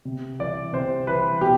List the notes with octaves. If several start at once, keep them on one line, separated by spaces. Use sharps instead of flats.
C3
E3 D5
C3 C5
E3 B4
B2 G4